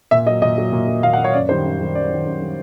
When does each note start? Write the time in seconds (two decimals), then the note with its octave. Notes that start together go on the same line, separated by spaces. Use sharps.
0.11 A#2 E5
0.26 F#3 D#5
0.42 A#2 D#5
0.58 F#3
0.72 A#2
0.88 F#3
1.03 A#2 F5
1.13 F#5
1.18 F#3
1.24 C#5
1.34 F#2 D5
1.49 D#3 G3 C5
1.64 F#2
1.80 D#3 G3
1.95 F#2 D5
2.10 D#3 G3
2.26 F#2
2.42 D#3 G3